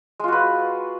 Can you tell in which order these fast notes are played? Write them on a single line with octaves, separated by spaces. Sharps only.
G#3 F4 F#4 B4